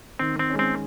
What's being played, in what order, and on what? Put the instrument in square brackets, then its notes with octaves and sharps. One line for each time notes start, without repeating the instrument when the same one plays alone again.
[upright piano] D#3 [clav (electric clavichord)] C4
[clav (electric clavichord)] C4
[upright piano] G#3 C#4
[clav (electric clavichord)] C4